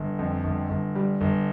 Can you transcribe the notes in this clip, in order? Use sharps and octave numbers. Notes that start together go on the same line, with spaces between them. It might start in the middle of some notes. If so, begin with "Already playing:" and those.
Already playing: G1
F2
G1
G1
G3
G1